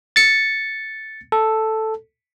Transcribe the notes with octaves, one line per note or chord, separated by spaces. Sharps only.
A6 C#7
A4